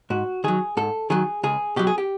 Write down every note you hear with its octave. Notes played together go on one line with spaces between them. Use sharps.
G#2 F#4
D#3 F#3 G#4
G#2 A4
D#3 F#3 G#4
C#2 G#4
B2 F#3 G4
G#4
G4